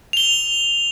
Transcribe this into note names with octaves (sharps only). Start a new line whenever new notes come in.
F7 G7